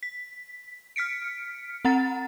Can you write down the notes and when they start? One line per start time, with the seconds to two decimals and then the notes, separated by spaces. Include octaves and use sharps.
0.03 B6
0.96 F6 B6 C#7 D7
1.85 C4 F#5 A#5 A6